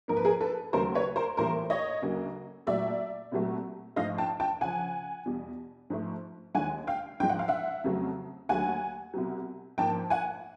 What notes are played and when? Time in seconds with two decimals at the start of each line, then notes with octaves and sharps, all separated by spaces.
0.08 G#2 F3 A#3 A#4
0.17 B4
0.25 G#4 A#4
0.41 A4 B4
0.73 D#2 C#3 F#3 A3 A#4 C5
0.95 B4 C#5
1.16 A#4 C5
1.37 A2 E3 G3 A#3 A#4 C5
1.70 C#5 D#5
2.02 D2 C#3 F#3 A#3
2.67 A#2 F#3 A3 D5 E5
3.32 C2 A#2 F#3 A3
3.96 G#2 F3 A3 D#5 F5
4.18 G5 A5
4.40 G5 A5
4.61 C#2 C#3 F3 F#5 G#5
5.26 E2 B2 G3
5.90 G#2 F3 A3
6.55 D#2 D#3 G#3 F#5 G#5
6.87 F5 G5
7.20 G#2 F3 G#3 G5
7.29 F#5
7.39 F5
7.48 E5 F#5
7.84 F2 C#3 F#3 A3
8.49 D#2 D3 F#3 A3 F#5 G#5
9.14 C2 B2 F#3
9.78 G#2 F3 A#3 G5 A5
10.10 F#5 G#5